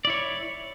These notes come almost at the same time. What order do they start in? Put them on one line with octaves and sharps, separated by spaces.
D5 E4 C#5